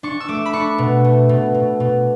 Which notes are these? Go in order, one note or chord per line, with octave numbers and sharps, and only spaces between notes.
D4 C#6
E6
A3 D6
B5
D4 C#6
B2
A3
B2
B2
B2